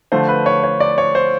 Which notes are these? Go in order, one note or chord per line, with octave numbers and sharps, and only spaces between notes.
D3 F3 A3 C5
B4
C#5
C#5
D5
C#5
C5